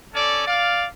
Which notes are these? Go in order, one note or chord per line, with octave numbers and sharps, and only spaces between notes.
C#4 A4 D5
D5 F5